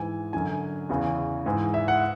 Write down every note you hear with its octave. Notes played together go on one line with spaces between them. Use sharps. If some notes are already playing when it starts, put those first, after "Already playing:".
Already playing: G#2 E3 G#5
F#2 D3 G#5
E2 C#3 E3
G#2 E3
E5
F#5